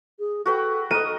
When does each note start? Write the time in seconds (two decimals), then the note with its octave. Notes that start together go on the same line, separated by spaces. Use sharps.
0.19 G#4
0.46 F#4 A4 B4 G5
0.91 A#4 D#5 D#7